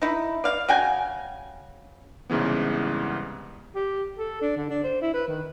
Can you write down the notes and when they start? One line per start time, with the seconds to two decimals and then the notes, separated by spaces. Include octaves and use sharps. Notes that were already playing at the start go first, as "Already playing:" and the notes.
0.02 D#4 E4
0.44 D5 F5
0.69 C#3 F#4 G5 G#5
2.30 C2 G#2 C#3 E3 B3
3.76 G4
4.18 A4
4.42 D4
4.57 D3
4.70 D4
4.84 C5
5.02 E4
5.14 B4
5.28 D#3